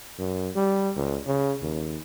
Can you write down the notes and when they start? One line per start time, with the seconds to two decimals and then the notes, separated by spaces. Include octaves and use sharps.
0.19 F#2
0.55 G3
0.96 C#2
1.26 C#3
1.62 D#2